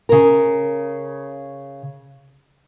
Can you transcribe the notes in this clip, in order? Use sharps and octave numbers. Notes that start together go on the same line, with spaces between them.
C#3 A#4